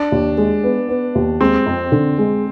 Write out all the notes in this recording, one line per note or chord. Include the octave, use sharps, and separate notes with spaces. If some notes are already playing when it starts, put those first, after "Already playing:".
Already playing: D4
D#2
G#3
B3
B3
D#2
G#3 C4
F2
D3
G#3